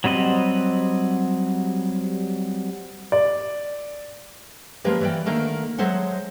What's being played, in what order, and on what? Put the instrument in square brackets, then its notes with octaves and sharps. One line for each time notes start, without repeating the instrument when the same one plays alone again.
[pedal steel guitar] F#3 G3 C4 D#5 F#5
[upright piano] D5
[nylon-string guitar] F3 G#3 A#3 C#4 G4 B4
E3 G3 C#5 D5 G5
D3 D#3 A3 A#3 D4
F#3 G#3 A4 C5 E5 F#5